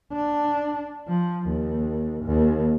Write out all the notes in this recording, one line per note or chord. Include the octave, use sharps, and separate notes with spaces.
D4
F3
D#2
D#2